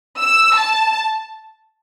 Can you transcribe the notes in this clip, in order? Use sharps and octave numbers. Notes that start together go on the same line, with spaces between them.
E6
A5